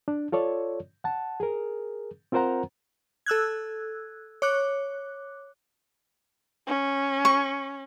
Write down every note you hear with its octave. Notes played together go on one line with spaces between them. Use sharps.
D4
F4 A4 C#5 D5
F#5 A5
G#4 A#4
C4 F4 A#4 C5 F#5 A#5
A4 E6 F#6 G#6
C#5 D6 F#6
C#4
C#6